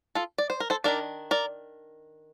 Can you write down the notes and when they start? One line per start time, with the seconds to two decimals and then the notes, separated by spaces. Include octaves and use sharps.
0.15 F4 A4
0.38 D5
0.50 C5
0.60 A#4
0.70 A4 C5
0.84 D#3 A#3 D4 A#4 D5
1.31 A#4 D5